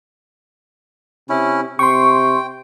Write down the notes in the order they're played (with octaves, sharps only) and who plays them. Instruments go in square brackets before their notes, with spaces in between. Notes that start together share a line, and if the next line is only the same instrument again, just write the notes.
[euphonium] C3 [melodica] C#4 E4
[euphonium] C3 [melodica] G5 [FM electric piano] C6 C#6